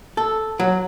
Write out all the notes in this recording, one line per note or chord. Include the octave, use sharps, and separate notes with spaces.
A4
F#3